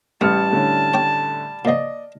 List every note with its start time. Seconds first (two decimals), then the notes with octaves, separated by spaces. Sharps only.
0.21 A1 G3 A3 A5 F6 C#7
0.51 A2 D3 C#4
0.94 C#5 G5 D6
1.65 A#2 F3 D5 D#5